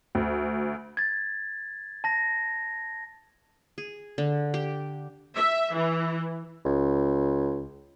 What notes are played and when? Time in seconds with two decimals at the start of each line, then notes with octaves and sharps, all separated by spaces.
0.15 D2
0.97 G#6 A6
2.04 A5 A#6
3.78 G#4
4.18 D3
4.54 G4
5.34 E5
5.74 E3
6.65 C#2